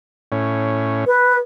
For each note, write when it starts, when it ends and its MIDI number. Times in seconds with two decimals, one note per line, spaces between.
0.32 1.05 45
0.32 1.05 61
1.07 1.36 71